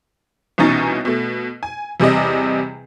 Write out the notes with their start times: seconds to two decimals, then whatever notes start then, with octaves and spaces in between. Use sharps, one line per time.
0.58 C2 B2 E3 C#4 D#4 A6
1.05 B2 A3
1.63 G#5
2.00 E2 C3 G3 D5 D#5